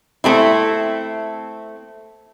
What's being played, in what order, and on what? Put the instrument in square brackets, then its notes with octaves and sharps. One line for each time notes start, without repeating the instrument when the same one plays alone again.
[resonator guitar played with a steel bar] A3 C4 E4